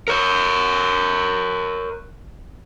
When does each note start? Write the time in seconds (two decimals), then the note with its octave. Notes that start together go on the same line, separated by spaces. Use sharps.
0.08 A#4 C#5